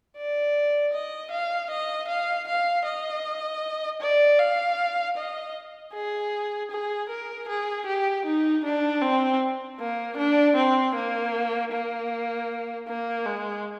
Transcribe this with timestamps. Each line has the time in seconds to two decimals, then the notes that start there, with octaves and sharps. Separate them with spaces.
0.17 D5
0.93 D#5
1.31 F5
1.70 D#5
2.09 F5
2.48 F5
2.86 D#5
4.01 D5
4.39 F5
5.18 D#5
5.94 G#4
6.71 G#4
7.09 A#4
7.48 G#4
7.87 G4
8.26 D#4
8.64 D4
9.02 C4
9.80 A#3
10.17 D4
10.56 C4
10.95 A#3
11.72 A#3
12.88 A#3
13.26 G#3